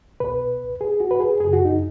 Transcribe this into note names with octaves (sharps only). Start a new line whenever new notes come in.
C#2 B2 B4
G#4
F#4
B4
G#4
F#2 C#3 G#4
F#4
D#4